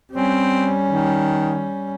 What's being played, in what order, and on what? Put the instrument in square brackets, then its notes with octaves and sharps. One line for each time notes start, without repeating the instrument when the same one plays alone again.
[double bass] G3 C#4 [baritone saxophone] C4
[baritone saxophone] D#3